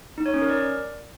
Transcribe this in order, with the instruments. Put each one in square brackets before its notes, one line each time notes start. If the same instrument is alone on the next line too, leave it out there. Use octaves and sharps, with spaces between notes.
[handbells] D#4
C#5
C#4
A#4
D5